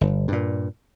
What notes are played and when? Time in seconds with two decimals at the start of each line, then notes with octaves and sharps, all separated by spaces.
0.01 G1
0.28 G2 A#2